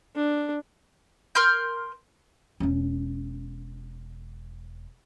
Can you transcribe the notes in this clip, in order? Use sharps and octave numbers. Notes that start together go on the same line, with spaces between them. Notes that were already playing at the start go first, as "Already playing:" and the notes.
D4
A#4 C6 F6 G6
E1 C#4